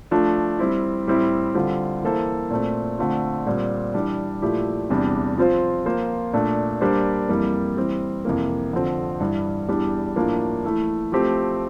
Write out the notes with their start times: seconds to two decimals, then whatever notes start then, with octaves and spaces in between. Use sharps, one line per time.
0.11 F3 A3 D4 F4
0.59 G3 C4 E4
1.07 A2 G3 C4 E4
1.55 D3 G3 C4 F4
2.02 E3 A#3 E4 A4 C5
2.51 A#2 A3 C4
2.99 D3 A3 C4 F4
3.46 A#2 G3 C4
3.94 E3 G3 D4
4.42 A#2 F3 A3 E4 G4
4.90 E2 C3 E3 G3 D4
5.38 F3 C4 F4 C5
5.86 F3 A#3 F4 C5
6.34 A#2 A3 D4
6.81 G3 A#3 D4 G4 C5
7.29 F2 E3 G3 A#3
7.77 E3 G3 C4
8.25 F2 C3 E3 A#3
8.73 F2 D3 F3 C4
9.20 G2 E3 G3
9.68 E2 E3 G3 D4 G4
10.16 A2 F3 A#3 D4
10.64 E3 A3 E4
11.12 F3 A3 C4 G4